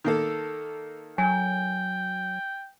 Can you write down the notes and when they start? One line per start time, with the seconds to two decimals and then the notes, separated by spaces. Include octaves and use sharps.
0.04 D#3 A#3 A4
1.18 F#3 G5 G#5